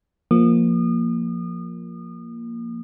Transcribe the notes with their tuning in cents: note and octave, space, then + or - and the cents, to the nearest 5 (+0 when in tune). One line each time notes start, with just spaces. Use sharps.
F3 +0 A#3 +0 D#6 -35